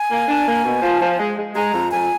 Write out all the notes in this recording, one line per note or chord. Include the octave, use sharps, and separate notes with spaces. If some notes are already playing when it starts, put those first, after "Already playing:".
Already playing: G#5
A#3
D4
A#3
B2
F3
F3
G#3
G#3
G#3 A#5
F2
F2 G#5